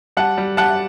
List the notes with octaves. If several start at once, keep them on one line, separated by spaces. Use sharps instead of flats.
G3 F#5 A5
G3
G3 F#5 A5